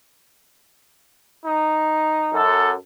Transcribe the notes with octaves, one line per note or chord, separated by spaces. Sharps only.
D#4
F#2 A4